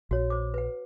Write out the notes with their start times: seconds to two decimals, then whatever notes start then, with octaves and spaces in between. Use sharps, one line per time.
0.11 A#1 F#4 C#5
0.30 C5 D6
0.54 B4 F#5